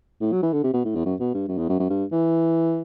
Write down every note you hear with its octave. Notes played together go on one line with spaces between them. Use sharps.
A2
F#3
E3
D3
C3
B2
A2
E2
F#2
B2
G2
F#2
E2
F#2
F#2
G2
E3